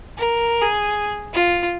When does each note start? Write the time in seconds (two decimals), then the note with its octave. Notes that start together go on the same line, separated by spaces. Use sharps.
0.18 A#4
0.62 G#4
1.34 F4